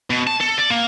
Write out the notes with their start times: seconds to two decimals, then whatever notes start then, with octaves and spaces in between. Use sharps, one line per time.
0.10 B2
0.27 A5
0.41 A4
0.58 D5
0.71 A#3